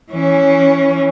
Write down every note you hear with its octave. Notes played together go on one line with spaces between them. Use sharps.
E3 C#4